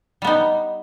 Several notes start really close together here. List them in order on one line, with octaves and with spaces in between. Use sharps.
G3 B3 D#4